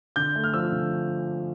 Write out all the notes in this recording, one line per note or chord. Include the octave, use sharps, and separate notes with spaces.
D3 G6
A3
F6
F3 E6
D3